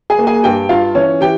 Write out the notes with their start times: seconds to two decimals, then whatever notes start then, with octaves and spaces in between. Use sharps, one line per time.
0.10 G#4 G#5
0.18 A#3
0.27 G#4 G#5
0.43 G2 G4 G5
0.69 G2 F4 F5
0.95 E3 C#4 C#5
1.21 E3 G4 G5